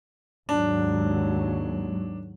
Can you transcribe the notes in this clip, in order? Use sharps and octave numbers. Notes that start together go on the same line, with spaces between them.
D#2 G#2 F#3 D4